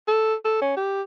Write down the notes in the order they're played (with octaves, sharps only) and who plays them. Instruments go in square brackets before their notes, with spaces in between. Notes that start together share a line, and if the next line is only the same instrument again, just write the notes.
[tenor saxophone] A4
A4
C#4
G4